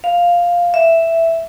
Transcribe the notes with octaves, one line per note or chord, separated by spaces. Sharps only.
F5
E5